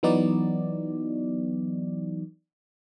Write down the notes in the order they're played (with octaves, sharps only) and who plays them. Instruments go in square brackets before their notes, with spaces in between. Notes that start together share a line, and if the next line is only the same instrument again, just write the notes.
[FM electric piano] E3 F#3 B3 D#4 F#4 D5